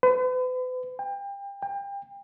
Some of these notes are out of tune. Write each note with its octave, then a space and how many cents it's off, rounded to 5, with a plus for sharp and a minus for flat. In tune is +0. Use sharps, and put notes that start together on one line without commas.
B4 +40
G5 +30
G5 +30